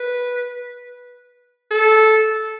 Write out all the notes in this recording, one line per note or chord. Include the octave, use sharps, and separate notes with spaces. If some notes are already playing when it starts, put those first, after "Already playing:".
Already playing: B4
A4